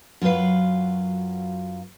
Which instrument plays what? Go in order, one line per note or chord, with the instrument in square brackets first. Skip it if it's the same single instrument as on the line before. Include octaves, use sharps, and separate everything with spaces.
[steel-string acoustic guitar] F#2 F#3 F4 B4 F5